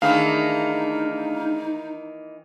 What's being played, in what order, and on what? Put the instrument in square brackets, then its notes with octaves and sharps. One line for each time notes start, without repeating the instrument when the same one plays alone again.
[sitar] D#3 E3 A#3 [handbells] A3 D4 G#4 [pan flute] D#4 [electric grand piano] F5